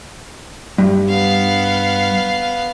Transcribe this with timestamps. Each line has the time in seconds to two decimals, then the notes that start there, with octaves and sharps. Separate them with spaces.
0.78 G2
1.09 B3 F5